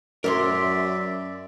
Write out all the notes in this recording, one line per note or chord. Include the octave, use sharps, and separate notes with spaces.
F#2 A#4 C#5 D5 E5 C6